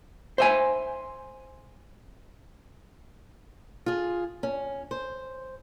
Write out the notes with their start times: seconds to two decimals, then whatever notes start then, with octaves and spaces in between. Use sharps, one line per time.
0.38 C5 E5 G#5
3.86 F4 G#4
4.43 C#4
4.91 C5